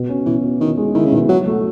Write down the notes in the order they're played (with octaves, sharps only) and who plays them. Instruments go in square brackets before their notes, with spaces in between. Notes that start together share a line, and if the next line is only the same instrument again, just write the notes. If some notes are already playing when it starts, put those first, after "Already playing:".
Already playing: [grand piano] B2
C#4
[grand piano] B2 [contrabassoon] E3
[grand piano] B2
[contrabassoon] D#3 [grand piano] E4
[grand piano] G#3
[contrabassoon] D#3 [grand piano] E4
[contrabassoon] C#3
[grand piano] B2 [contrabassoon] D#3
[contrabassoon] F#3 [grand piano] F#4
[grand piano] A3